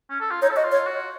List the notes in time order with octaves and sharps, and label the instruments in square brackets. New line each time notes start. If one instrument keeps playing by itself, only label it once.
[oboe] C#4
A4
F4
[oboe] D#4 [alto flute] C#5
[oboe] A4
[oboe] F#4 [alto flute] D#5
[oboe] F4
[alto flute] C#5
[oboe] F#4